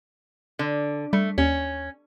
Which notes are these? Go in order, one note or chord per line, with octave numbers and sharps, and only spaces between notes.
D3
G3 A3
D#2 C#4